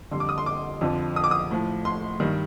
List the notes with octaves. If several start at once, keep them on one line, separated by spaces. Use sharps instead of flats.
F2 D3 G3 C6
D6
D#6
C6
D6
F2 D3 F3
D#6
D6
D#6
A2 F3
C6
G2 D#3 G3